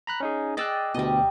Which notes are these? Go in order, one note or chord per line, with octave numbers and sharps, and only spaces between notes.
A#5 B5 F#6
C#4 D#4 G#4
G#4 D5 D#5 G5 E6 F#6
D2 B2 G3 D#5